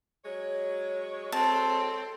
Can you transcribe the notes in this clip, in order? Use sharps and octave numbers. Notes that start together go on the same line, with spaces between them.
F#3 G#3 C#5
C4 A4 A5